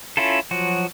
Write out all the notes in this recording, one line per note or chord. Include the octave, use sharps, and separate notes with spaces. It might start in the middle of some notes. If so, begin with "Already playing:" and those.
C#4 E4 F4 A4
F3 F#3 F#4